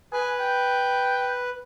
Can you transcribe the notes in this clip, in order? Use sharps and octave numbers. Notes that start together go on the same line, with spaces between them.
B4 G#5
G5